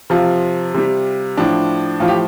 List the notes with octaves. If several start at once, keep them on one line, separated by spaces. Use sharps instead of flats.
C3 F3 F4
C3 G3
A2 F3 D4
A2 F3 F4
G4